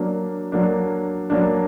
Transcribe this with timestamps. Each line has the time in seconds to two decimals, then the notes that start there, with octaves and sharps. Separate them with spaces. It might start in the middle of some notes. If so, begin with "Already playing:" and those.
Already playing: F#3 A#3 D4
0.52 F#3 A#3 D4
1.30 F#3 A#3 D4